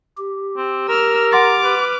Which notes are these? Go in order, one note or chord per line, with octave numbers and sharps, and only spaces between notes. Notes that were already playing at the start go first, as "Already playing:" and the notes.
G4
C4
A#4 E6 F6
F#5 C6 D6 F6 A6
B4